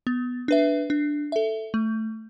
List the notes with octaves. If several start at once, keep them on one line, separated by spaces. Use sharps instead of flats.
B3
D4 B4 E5
D4
A4 E5
A3